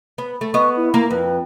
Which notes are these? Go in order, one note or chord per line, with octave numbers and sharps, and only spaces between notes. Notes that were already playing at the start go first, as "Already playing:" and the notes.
B3
A3
B3 D#5 C#6
E4
A#3
F2 B4